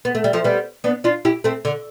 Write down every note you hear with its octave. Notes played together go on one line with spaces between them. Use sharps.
B3
A3
G3
F3 A3
G3 B3
B3 D4
D4 F4
E4 G4
A3 C4
D3